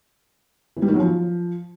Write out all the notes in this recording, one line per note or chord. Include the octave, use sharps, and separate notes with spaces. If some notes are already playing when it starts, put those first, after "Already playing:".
E3
G3
D#3
F#3
F3